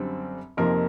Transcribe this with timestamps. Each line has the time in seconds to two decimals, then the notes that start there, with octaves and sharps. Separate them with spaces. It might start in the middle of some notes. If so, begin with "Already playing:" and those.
Already playing: F#2 D3 G3 C4
0.57 F2 C3 F3 A#3 D#4 A#4